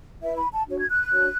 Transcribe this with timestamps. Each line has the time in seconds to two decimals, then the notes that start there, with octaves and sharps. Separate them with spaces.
0.22 E4 B4 E5
0.37 B5
0.52 A5
0.67 D4 F#4 C#5
0.78 G#6
0.89 F#6
1.11 D4 F#4 C#5